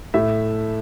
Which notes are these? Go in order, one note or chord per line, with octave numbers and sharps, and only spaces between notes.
A2 A3 E5